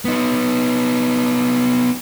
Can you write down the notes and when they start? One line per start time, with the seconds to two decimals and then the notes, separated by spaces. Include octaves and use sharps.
0.05 B3 D#4